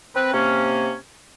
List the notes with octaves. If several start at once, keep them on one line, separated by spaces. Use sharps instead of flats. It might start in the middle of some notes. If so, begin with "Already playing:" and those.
C4 B4
C3 A#3 C#4